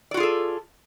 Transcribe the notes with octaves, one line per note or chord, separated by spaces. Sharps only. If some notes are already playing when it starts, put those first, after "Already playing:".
F4 F#4 G#4 A4 D5